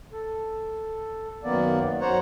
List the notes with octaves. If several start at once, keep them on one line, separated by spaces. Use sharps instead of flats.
A4
F#2 D#3 A#3 B3 D5
F#2 C5 C#5 F#5 A#5